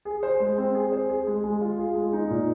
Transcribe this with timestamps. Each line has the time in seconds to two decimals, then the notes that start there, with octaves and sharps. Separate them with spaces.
0.05 G#4
0.23 C5
0.40 G#3
0.58 C4
0.75 G#4
0.92 C5
1.09 G#4
1.27 G#3
1.44 G#3
1.61 F4
1.78 G#4
1.95 G#3
2.13 D#4
2.30 A#2